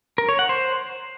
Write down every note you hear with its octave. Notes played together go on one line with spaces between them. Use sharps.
A#4
C#5
F#5
C5